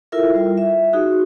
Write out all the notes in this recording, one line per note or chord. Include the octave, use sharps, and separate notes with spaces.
E4 F4 A4 A#4 E5
G3 F4
E5
D#4 F#4 G#4